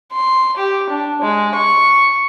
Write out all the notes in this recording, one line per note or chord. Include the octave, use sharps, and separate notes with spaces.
C6
G4
D4
G#3
C#6